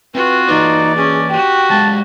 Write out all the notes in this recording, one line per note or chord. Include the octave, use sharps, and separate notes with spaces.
C4 F4 F#4 B4
E3 A#3 D#4 B4 D5
C#4 G#4
F#4 G4 G5
F#3 G#3 F5 A5